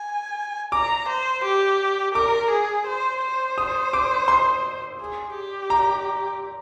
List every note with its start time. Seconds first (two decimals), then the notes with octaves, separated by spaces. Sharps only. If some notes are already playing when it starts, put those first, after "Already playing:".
Already playing: G#5
0.72 A#5 D6
1.08 C5
1.44 G4
2.14 A#4 D6
2.50 G#4
2.87 C5
3.22 C5
3.58 D#6
3.93 D6
4.28 C6
5.00 G#4
5.35 G4
5.70 A#5